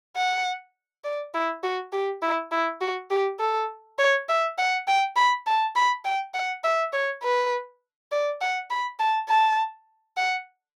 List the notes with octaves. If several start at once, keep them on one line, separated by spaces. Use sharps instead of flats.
F#5
D5
E4
F#4
G4
E4
E4
F#4
G4
A4
C#5
E5
F#5
G5
B5
A5
B5
G5
F#5
E5
C#5
B4
D5
F#5
B5
A5
A5
F#5